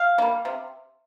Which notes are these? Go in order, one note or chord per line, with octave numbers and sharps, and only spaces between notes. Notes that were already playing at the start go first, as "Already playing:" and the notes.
Already playing: F5
G3 A#3
C3